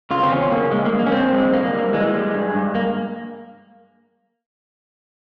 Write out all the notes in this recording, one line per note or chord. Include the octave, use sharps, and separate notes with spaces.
C#3 F4
C4
E2 C#4
C#3 A#3
G2 G#3
A#3
G#3
A#3
C#4
G2 C4
G#3
G2 A#3
G3
E3 G#3
G3
G2
G2
A#3